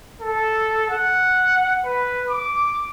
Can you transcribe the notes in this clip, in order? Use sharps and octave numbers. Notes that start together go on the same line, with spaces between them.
A4
F#5
B4
D6